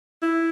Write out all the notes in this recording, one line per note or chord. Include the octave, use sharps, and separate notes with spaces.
E4